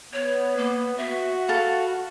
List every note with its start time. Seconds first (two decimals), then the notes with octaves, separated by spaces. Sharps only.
0.13 B3 C#5
0.57 A#3
0.97 F#4 E5
1.48 A4 F5 F#5 B5